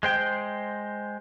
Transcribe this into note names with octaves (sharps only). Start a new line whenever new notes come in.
G#3 C5 G5